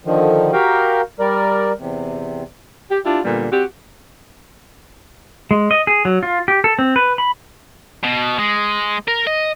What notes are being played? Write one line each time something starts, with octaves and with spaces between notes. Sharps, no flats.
D3 D#3 F3
F#4 G4 A#4 F5 G5
G3 A#4 D5
E2 C3
G4
D4 E4 F4 G4
A#2 D3 G3 B3
C4 F#4 G4
G#3
D#5
G#4
F#3
F4
G4
A4
C4
B4
B5
B2
G#3
A#4
D#5